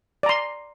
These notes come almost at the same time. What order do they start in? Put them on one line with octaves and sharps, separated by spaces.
D5 A#5 C6